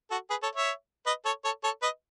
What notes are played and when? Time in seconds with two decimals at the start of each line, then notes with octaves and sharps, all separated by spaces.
0.10 F#4 A4
0.30 G#4 B4
0.43 A4 C#5
0.55 C#5 E5
1.06 B4 D#5
1.25 A4 C#5
1.44 A4 C#5
1.64 A4 C#5
1.82 B4 D#5